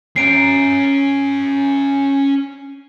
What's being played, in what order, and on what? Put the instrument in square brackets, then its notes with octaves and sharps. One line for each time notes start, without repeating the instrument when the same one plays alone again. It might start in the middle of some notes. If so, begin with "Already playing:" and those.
[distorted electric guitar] C#4 A#5 [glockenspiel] C7 D7